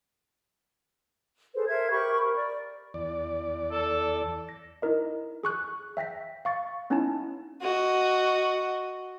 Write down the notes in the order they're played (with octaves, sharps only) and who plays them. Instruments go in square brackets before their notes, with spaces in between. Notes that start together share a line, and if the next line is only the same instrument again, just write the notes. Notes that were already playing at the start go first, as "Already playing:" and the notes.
[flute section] G#4 A4 B4 C5
A#4 C5 E5 G#6
G4 A#4 B5 C#6
A#4
D5
[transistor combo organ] E2 D5
[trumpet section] A4
[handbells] A#6
D#4 E4 A#4 D#5
G#4 C#6 F#6
E5 G5 A#6 B6
F5 C#6 A6 C#7
B3 C#4 D#4 E4 G#5 A5
[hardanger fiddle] F#4 D#5